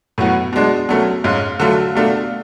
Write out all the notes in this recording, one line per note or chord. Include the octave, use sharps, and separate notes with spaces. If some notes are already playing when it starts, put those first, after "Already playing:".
A2 F#3 B3 F#4
B2 G#3 D4
B2 F#3 A3 C#4
G#2 G#3 C#4 F4
D3 F#3 A3 F4
B2 A3 D4 F4